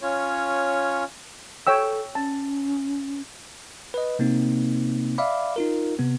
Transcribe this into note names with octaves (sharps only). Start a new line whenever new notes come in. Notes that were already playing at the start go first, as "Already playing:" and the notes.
C#4 F4 C#5
A4 C#5 G5 E6
C#4 A5
B4 D#5
C3 A#3 C4 D#4
D5 E5 F5 B5 D6
D#4 F4 A#4
C3 B3